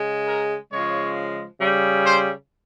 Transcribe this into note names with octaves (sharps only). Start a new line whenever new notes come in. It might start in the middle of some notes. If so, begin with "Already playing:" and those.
Already playing: C#3 G#3
A#4
C#3 F3 G#3 C#5
C#3 G3
C5